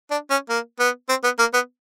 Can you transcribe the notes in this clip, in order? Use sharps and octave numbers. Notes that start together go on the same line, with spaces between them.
D4
C#4
A#3
B3
C4
B3
A#3
B3